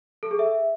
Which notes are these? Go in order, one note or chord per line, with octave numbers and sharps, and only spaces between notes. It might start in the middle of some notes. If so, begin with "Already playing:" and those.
A4
G#4
E5